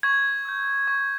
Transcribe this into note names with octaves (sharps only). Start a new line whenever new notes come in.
C#6 G#6
E6 G6
C#6